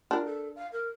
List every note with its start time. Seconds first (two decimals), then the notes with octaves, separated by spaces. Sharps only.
0.11 D4 F4 A#4
0.25 A4
0.56 F5
0.72 A#4